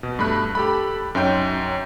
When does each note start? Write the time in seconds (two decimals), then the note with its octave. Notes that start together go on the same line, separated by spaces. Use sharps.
0.03 B2
0.19 G2 A3 B5 F#6
0.55 G4 A4 B5
1.15 F#2 C#4 D#4 G5 G6